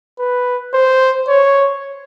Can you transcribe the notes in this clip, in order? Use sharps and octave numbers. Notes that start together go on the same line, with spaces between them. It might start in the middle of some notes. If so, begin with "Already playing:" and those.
B4
C5
C#5